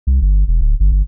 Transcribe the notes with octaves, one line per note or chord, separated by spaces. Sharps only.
C2
G1
E1
D1
G1
G1